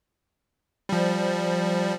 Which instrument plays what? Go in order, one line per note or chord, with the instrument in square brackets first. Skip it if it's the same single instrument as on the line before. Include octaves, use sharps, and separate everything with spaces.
[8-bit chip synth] F3 G3